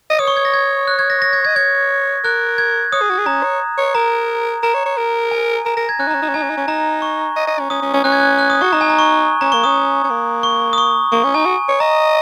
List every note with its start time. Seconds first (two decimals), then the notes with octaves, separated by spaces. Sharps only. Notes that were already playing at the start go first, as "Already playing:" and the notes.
0.10 D#5
0.19 C#5 D#6
0.28 C#6
0.37 G#6
0.45 A#6
0.54 G#6
0.88 F#6
0.99 G#6
1.10 A#6
1.22 A#6
1.33 G#6
1.45 D#5 G#6
1.56 C#5 G#6
2.24 A#4 F#6
2.58 G#6
2.92 C#5 D#6
3.01 G#4
3.10 F#4
3.18 G#4
3.26 C#4 A#5
3.43 C#5
3.78 C#5
3.95 A#4 A#5
4.63 A#4 A#5
4.74 C#5
4.86 C#5
4.97 A#4
5.31 G#5
5.65 A#4 A#5
5.77 A#4 A#6
5.89 G#6
5.99 C#4 F#6
6.07 D#4
6.11 A#5
6.15 C#4
6.22 D#4 A#5
6.29 C#4
6.34 D#4 G#5
6.43 C#4
6.50 D#4
6.57 C#4
6.67 D#4 A#5
7.02 C#6
7.36 D#5
7.47 D#5
7.59 C#4
7.70 C#4 D#6
7.82 C#4
7.93 C#4
8.04 C#4 F#6
8.12 G#6
8.20 F#6
8.39 F#6
8.50 D#6
8.62 F#4 C#6
8.73 D#4 A#5
8.81 G#5
8.90 A#5
8.99 C#6
9.41 C#4 A#5
9.52 A#3 C#6
9.64 C#4 D#6
10.04 C#4
10.10 A#3
10.43 C#6
10.73 D#6
10.78 C#6
11.12 A#3 C#6
11.24 C#4
11.34 D#4 G#5
11.45 F#4
11.68 C#5
11.80 D#5 A#5